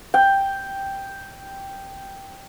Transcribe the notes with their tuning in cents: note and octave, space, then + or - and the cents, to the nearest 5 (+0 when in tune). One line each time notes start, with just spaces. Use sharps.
G5 +0